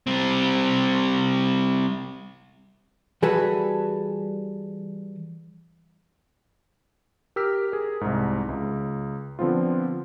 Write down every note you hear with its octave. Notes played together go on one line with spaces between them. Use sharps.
G3 C4
E3 G3 F#4 G#4 A4 B4
G4 A#4 E6 F6 B6
G#4 A#4
C2 G#2
C#2
D3 F3 B3 C4 F4